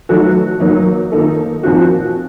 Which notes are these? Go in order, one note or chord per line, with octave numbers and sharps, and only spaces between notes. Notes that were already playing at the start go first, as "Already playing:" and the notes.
F#3 A3 D#4 F#4 A4
F#3 A#3 D#4
D#3 A#3 D#4 A4
A#2 F3 C4 D#4 F#4